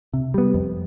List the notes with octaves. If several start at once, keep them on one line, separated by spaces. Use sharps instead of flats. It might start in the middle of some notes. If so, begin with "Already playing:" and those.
C3
G3 B3
F2